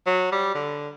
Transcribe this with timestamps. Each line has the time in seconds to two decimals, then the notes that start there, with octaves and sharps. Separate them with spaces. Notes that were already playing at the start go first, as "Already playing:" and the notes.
0.07 F#3
0.32 G3
0.55 D3